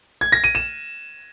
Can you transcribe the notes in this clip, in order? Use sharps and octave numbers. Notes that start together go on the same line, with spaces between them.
G#6
A#6
D#7
E7